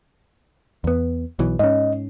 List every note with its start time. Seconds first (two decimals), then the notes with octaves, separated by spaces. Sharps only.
0.84 E2 B3
1.39 B1 B2 E3
1.59 G#2 C#4 D#5